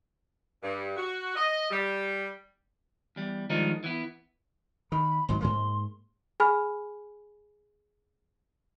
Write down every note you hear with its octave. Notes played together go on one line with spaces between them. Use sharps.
G2
F#4
D#5
G3
E2 G3
D#3 F3 G3 G#3 D4 D#4
E3 B3
D#3 B5
G#1 G#2 F#3 C6
G#2 G#3 A#3 C6
G#4 G#5 B5 F6